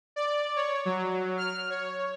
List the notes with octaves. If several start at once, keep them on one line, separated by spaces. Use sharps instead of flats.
D5
C#5
F#3
F6
C#5